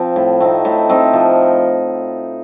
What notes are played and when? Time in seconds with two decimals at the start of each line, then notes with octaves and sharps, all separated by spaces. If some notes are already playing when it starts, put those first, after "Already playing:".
Already playing: F3 C4
0.16 A2
0.40 A3 C4 D#4
0.65 A2
0.89 A3 C4 D#4
1.13 F3